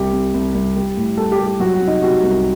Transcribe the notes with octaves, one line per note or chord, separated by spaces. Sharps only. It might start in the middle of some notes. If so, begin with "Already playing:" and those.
Already playing: C2 G4
C2
C2
C2
G3
A2
G3 A4
G4
G3
G4
F#3 F#4
F#4
C3
D#4
C3 F#4
C2